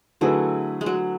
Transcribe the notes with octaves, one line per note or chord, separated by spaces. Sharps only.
D3 F#3 A3 E4 G#4 B4
G#3
F#3